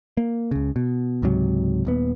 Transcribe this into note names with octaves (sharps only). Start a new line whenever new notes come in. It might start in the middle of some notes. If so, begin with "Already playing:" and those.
A#3
C#2 C#3
B2
C#2 G#2 C3 F#3
D#1 D#2 B3